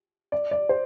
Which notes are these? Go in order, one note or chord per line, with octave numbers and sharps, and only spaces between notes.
D5
D5
C5